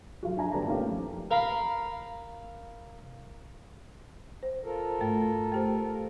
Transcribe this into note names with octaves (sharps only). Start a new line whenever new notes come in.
F#3 F4 F#4
D4 E5 G#5 A#5
G1 G4 B4 D5 A5 A#5
A3 A#3 C#4 D#4 F4 G4
F2
A#4 F5 B5
C5
F4 A4 A#4
G#2 A3
A3 G4 C5